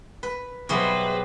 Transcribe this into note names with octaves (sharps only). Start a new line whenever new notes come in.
B4
B2 F#3 G3 E4 G#4 B4 C5